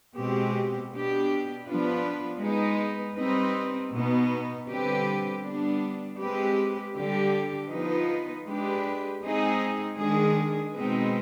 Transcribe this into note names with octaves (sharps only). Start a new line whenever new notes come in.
B2 G#3 C4 G4
B2 B3 D4 G4
F3 B3 D4 F4 B4
G#3 B3 D#4 B4
G3 C4 D#4 B4
B2 B3 D#4
D3 G3 C4 G4 B4
G3 B3 D4
G#3 C4 G4 B4
D3 G3 D4 G4
F3 B3 D#4 B4
G#3 D4 G4 B4
G#3 C4 D#4 G#4
D#3 G#3 D4 G#4
B2 G#3 C4 D#4 B4